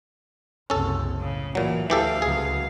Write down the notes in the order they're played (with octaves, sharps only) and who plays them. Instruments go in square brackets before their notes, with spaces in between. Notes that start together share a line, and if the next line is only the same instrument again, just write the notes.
[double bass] F#1 C2 [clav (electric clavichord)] C#4 A4
[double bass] A2 [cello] C#3
[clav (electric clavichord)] A#2 F#3 [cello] E3
[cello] D2 F5 [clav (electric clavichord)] E3 G4 A4
[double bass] C#2 F#3 [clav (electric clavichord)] G#4